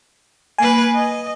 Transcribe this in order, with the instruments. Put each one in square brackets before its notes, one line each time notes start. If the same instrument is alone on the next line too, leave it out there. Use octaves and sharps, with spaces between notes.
[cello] A#3 B4 [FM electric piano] G#5
[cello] D#5